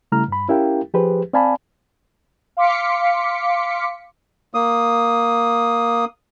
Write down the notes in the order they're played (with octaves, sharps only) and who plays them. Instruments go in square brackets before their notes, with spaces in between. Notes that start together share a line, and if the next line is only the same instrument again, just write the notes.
[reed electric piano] C#3 G3 A3 E4 A#5 F6
G2 B5
C#4 E4 G4 A#4 F5 G5
F3 G4 G#4 B4 C5
C4 D5 F5 G#5 A5 B5
[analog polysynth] F5 C6 D6 B6 C#7
[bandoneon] A#3 D#6